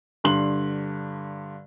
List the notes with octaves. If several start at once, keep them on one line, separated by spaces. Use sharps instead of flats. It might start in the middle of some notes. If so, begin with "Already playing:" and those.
G2 D3 C6 F#7